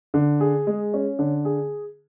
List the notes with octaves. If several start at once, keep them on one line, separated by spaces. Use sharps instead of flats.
D3
G#4
G#3
C#4
D3
G#4